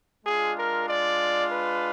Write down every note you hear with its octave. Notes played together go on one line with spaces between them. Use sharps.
G#3 D4 F4 G#4
A#4
D5
B4